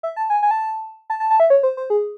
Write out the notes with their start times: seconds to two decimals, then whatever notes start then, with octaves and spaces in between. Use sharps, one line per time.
0.03 E5
0.16 A5
0.30 G#5
0.43 G#5
0.51 A5
1.10 A5
1.20 A5
1.30 A5
1.40 E5
1.50 C#5
1.63 C5
1.77 C5
1.90 G#4